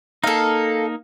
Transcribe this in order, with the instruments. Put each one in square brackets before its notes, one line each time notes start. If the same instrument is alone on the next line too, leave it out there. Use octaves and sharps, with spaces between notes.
[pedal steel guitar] A#3 D#4 [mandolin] A4 F5